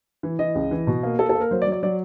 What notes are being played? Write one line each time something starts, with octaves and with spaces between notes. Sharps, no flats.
E3
E3 D#5
C#2
E3
B2
A#3
A#3 A4
A4
A#3 A#4
F#3 C5
D5
F#3
D5
F#3 D5